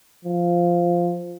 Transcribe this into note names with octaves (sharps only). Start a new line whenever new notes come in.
F3